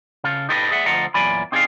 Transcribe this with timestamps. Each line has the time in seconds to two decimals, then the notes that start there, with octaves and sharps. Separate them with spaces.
0.24 C#3 A4 F5
0.49 D#4 G4 A4 B4 C5 D#5
0.71 G#4 D5 E5 F#5
0.86 D2 F3 A4 D#5 F#5 A#5
1.14 E2 A#2 F#3 D5 G#5 B5
1.52 C4 D#4 G#4 C#5 D5 F5